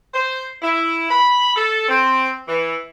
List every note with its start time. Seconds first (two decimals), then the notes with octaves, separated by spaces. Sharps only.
0.14 C5
0.62 E4
1.11 B5
1.56 A4
1.89 C4
2.47 E3